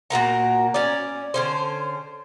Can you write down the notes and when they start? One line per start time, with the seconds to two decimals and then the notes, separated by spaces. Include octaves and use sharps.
0.10 A#2 F#4 A#4 A#5
0.74 C#4 D5
1.34 D3 C#4 C5